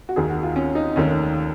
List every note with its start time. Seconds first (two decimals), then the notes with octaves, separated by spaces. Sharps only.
0.09 F#4
0.16 D#2 D#3 G#4
0.30 F#4
0.43 F4
0.56 C#4
0.75 D#4
0.96 F1 D#2 D#3 C#4